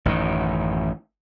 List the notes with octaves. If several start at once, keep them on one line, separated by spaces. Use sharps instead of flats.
A1 F#2 D#3